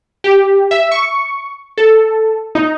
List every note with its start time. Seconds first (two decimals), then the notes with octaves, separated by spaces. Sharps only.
0.24 G4
0.71 E5
0.91 C#6
1.78 A4
2.55 D#4